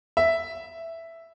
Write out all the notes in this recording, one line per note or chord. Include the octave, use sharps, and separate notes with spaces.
E5